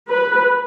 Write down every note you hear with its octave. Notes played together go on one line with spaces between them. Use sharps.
B4